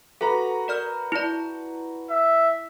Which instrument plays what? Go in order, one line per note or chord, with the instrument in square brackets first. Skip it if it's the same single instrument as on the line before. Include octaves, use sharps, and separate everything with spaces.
[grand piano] F#4 B4 A#5 [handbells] A4
[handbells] A#4 D5 F6
E4 D5
[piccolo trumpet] E5